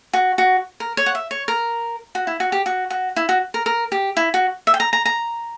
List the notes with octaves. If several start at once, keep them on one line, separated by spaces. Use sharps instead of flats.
F#4
F#4
A#4
C#5
F#5
E5
C#5
A#4
F#4
E4
F#4
G4
F#4
F#4
E4
F#4
A#4
A#4
G4
E4
F#4
E5
G5
A#5
A#5
A#5